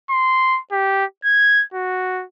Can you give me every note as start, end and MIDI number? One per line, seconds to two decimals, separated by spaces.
0.11 0.60 84
0.72 1.05 67
1.25 1.64 92
1.74 2.24 66